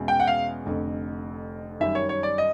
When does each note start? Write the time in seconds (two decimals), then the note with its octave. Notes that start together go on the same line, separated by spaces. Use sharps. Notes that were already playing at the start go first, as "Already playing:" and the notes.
Already playing: E2 B2 G#3 C#4
0.08 G5
0.20 F#5
0.27 F5
0.65 F1 F2 D3
1.80 F#2 D#3 G3 E5
1.95 C#5
2.09 C#5
2.23 D5
2.38 D#5